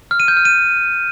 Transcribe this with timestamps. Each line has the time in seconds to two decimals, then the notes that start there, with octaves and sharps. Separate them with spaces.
0.11 F6
0.20 D#7
0.28 G6
0.37 F6
0.45 D#7